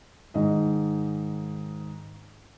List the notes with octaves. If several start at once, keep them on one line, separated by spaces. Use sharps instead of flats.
G#2 D#3 D#5